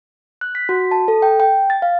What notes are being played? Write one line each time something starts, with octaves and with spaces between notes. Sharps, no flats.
F#6
B6
F#4
A5
A4
G5
G5
A6
F5